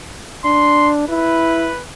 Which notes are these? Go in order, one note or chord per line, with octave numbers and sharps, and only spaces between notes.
D4 C6
E4 B4